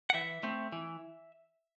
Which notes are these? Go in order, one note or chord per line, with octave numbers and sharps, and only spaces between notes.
F#5
E3 E5
A3 C4
E3